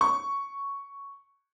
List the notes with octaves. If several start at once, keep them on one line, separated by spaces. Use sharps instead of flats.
C#6